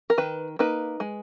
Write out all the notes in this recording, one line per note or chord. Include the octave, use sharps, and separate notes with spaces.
A#4
D#3 B4
A#3 D#4 B4
G#3